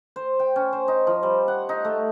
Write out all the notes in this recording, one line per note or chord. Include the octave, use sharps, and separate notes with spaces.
C5
G5
C#4
C5
D#4
F3
G3
F#5
D#4
A3